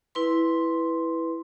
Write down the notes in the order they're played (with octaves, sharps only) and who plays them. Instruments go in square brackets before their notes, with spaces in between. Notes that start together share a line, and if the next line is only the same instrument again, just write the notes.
[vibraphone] E4 B4 C6